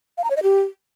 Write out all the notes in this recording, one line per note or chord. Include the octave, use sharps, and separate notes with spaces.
F5
A#5
C#5
D#5
G4